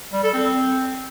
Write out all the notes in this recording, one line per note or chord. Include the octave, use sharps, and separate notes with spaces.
G3
A4
C4